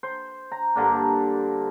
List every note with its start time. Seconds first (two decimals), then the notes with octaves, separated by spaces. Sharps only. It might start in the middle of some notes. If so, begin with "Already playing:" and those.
0.03 C5
0.52 A#5
0.75 G2 D3 A#3 D4